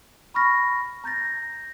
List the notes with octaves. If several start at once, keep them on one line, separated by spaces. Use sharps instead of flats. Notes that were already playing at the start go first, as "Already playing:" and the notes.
B5 C#6 F6 A#6
A#5 G6 A6 A#6